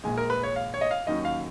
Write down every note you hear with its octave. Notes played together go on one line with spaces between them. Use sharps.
A#1 A#2 G#3 G#5
A#4
B4
C#5
F5
C#5
D#5
F5
D#2 D#3 F#3 C#4 D#5
F5